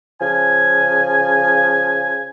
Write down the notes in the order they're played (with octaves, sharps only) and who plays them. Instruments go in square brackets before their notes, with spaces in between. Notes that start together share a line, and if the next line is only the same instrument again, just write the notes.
[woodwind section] C#3 F3 G#5